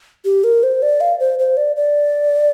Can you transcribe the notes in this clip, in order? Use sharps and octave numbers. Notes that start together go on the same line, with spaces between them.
G4
A#4
C5
D5
F5
C5
C5
D5
D5